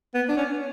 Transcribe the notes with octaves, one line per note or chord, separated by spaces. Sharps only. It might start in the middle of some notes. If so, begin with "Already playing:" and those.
B3
D4
C#4